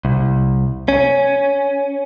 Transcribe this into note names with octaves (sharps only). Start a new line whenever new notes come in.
C2
C#4